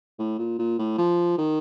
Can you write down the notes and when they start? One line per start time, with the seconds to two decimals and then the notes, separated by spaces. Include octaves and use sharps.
0.19 A2
0.38 A#2
0.58 A#2
0.78 A2
0.98 F3
1.38 D#3